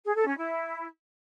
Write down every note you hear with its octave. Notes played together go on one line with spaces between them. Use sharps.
G#4
A4
C#4
E4